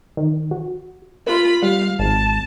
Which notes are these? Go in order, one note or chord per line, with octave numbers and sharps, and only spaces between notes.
D#3
F#4
F4 A#4 B5
G3 F5
G#1 A5